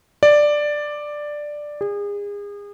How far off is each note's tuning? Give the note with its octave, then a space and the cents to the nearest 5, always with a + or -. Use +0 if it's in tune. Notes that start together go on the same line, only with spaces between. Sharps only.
D5 +5
G#4 -35